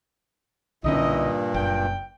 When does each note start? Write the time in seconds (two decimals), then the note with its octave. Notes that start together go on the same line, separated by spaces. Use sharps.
0.84 B1 G2 A#2 D3 C#4 D#4 E4 D#5
1.54 F#1 G5